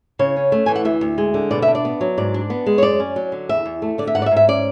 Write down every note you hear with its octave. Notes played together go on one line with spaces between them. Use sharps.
C#3 C#5
C#4
A3
E3 G#5
F#5
D2 E5
D2
G#3
D3
B2 D5
E5
D4
D5
B3
F#3
G#2 D5
D4
B3
G#3
C#5
F#2 D5
C#4
F#3
D3
E2 E5
E2
A3
D3 D5
E5
G#2 F#5
D5
E5
G#2
E5
C#4 D5